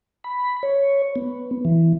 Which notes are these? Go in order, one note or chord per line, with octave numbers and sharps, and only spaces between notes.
B5
C#5
B3
E3